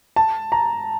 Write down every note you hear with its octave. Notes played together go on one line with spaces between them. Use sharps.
A5
A#5